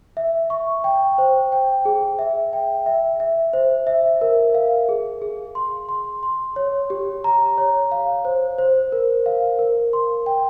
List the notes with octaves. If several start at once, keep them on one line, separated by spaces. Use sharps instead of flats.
E5
C#6
G5
C5
G5
G#4
E5
G5
E5
E5
C5
E5
A#4
F5
G#4
G#4
C6
C6
C6
C#5
G4
A#5
C#5
F5
C5
C5
A#4
F5
A#4
C6
G5